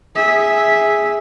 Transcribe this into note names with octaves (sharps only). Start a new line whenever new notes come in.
G#4 E5